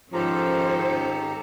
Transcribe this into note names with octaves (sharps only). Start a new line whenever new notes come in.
G#2 D#3 F3 C#4 G4 A4 C5 A#5